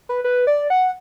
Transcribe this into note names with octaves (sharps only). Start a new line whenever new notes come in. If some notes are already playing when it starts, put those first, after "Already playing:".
B4
B4
D5
F#5